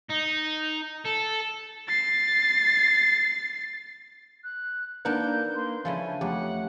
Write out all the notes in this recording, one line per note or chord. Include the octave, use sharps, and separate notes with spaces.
D#4
A4
A6 C7
F#6
A#3 D4 D#4 A#4 B4 F#5 G6
A#3 C6
C#3 F3 A3 D4 E4 G#5
F2 A3 C#4 G4 F#5